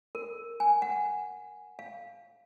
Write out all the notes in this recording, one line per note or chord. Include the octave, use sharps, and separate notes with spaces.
A#4
G#5
F#5
F5